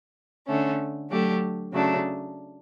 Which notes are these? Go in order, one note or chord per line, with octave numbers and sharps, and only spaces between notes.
D3 A3 C#4
F#3 A3 D4 G4
C#3 F#3 A3 D4